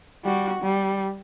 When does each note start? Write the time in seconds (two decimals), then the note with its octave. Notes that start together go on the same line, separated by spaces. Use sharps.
0.24 G3 F#4
0.62 G3